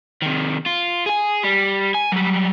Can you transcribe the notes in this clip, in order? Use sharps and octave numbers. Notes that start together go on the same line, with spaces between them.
C3 D#3
F4
G#4 G#5
G3
G#5
F#3 G3